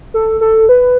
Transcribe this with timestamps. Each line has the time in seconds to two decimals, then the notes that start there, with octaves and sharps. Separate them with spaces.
0.14 A4
0.41 A4
0.69 B4